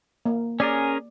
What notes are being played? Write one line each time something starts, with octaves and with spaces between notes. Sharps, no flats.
A#3
C#4 G#4 A#4 D5